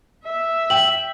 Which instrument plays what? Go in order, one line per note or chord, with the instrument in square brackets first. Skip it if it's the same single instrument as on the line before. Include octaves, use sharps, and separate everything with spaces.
[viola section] E5
[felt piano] G5 [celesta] F#7